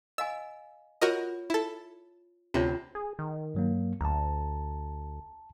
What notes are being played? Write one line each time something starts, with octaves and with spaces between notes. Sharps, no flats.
D#5 F5 G#5 E6
F4 F#4 A#4 C#5 D#5
E4 A4
D2 C3 C#4 F4 C#5
G#4
D#3
G2 F#3 A#3
D2 A5 A#5